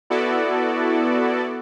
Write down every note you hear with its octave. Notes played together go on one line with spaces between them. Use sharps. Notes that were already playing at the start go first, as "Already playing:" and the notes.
B3 E4 F#4 A4 D5